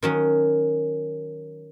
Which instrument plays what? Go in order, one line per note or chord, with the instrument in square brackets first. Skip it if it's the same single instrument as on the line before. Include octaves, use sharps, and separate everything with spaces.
[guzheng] D#3 F#3 C#4